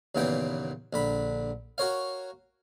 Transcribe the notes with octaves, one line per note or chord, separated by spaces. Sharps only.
D#2 A#2 C#3 E3 B3 G5
A#1 D3 B5
F#4 A#4 C#5 F5